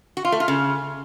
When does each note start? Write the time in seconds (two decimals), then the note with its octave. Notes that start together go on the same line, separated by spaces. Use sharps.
0.17 F#4
0.25 F4
0.32 A3
0.40 F4
0.48 C#3